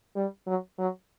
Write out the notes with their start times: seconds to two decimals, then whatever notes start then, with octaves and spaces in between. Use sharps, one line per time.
0.16 G3
0.47 F#3
0.79 F#3